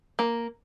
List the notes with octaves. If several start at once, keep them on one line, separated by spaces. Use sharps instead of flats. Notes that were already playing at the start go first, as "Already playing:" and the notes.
A#3